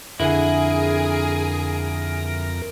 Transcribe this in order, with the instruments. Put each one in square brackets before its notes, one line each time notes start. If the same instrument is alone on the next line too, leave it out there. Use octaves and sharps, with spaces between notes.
[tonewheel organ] F2 A#4 [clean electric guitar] D3 E4 [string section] G#4